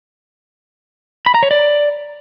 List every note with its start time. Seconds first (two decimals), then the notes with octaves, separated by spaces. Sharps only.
1.26 B5
1.34 A#5
1.43 C#5
1.51 D5